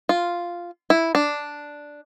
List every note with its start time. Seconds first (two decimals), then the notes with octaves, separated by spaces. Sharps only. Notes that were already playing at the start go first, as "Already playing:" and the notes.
0.09 F4
0.90 E4
1.15 D4